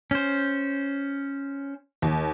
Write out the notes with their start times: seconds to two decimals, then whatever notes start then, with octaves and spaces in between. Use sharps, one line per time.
0.11 C#4 C5
2.02 D#2